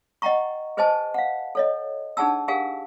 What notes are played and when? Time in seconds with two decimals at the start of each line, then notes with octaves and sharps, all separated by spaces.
0.22 D#5 F#5 G5 A#5 C#6
0.77 G#4 B4 C5 D#5 G#5 A5
1.14 F5 F#5
1.55 A4 C#5 D#5
2.17 D4 D#4 G#4 F#5 A5 E6
2.48 G4 G#4 A#4 F5 F#5 G#5